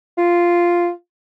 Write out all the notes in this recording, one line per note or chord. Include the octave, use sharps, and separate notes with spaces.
F4